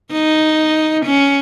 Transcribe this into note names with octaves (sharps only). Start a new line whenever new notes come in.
D#4
C#4